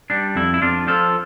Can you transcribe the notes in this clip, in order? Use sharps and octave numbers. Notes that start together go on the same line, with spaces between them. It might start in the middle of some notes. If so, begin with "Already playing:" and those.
G3 D4
F2 E4
E4
F2 D4 F4
F3 F4 A4